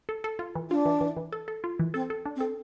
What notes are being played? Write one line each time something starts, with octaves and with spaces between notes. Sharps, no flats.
A4
A4
F4
E3
D4 F4
E3
E3
E3
A4
A4
F4
E3
C4 A4
A4
D4
C4
A4